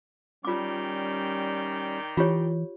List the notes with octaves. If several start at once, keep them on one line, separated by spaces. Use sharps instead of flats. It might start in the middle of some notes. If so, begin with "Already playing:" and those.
D#3 G3 C#4 F4 D5 G5 D6
E3 F4 G4 C#5